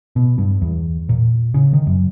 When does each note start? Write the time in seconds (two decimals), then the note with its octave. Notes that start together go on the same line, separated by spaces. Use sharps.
0.16 B2
0.38 G2
0.62 E2
1.09 A#2
1.54 C#3
1.73 D#3
1.87 F#2